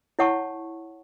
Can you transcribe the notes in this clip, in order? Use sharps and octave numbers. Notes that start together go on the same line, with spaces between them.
E4 C#5 F#5 A5 C#6